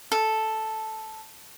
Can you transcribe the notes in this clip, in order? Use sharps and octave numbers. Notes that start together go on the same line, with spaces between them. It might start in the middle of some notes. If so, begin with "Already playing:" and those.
A4